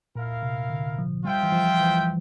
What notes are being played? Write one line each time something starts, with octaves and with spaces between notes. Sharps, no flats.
A#2 E4 A#4 F5
C3
D3
F3
G3 F4 C5 E5 G5
E3
F3
E3